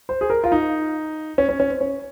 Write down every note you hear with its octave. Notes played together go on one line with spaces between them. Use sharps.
C5
G#4
A#4
F4
D#4
C#4
C#4
C#4
C4
C#4